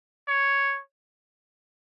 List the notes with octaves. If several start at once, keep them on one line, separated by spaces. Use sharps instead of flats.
C#5